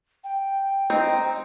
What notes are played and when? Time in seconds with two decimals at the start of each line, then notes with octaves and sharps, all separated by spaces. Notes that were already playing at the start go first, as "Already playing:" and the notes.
0.24 G5
0.90 C4 D#4